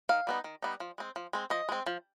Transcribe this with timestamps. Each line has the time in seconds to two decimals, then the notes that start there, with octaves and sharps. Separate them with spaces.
0.09 D#3 F5
0.27 G3 B3 D#4
0.44 D#3
0.62 G3 B3 D#4
0.80 F3
0.98 G#3 C4
1.16 F3
1.33 G#3 C4
1.50 F3 D#5
1.69 G#3 C4
1.86 F3